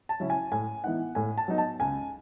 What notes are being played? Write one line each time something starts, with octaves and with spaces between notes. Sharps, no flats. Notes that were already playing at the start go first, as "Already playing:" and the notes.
A5
C#3 F#3 C#4 E4
G#5
A2 G#5
E3 B3 D#4 F#5
A2 G#5
A5
F#3 B3 D#4
A5
C#2 G#5